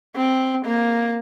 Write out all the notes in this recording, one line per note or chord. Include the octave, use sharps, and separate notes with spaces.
C4
A#3